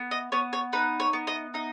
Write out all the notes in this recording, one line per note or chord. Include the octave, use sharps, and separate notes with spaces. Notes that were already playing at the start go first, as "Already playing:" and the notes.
Already playing: B3
D#5
B3 C#5
C#5
D#4 B4
C#5
B3
D#5
D#4 D#5